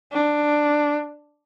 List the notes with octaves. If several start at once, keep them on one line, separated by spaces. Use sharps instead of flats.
D4